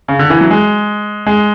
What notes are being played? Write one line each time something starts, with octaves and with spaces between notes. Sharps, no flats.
C#3
D3
E3
F#3
G#3
G#3